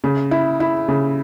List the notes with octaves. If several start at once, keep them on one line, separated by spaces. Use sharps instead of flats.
C#3
E4
E4
C#3